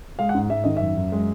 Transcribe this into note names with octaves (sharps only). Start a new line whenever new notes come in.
G#3 F5
F#5
G#2
G#2 E5
D#3 D#5
F#2 E5
F#2
G#3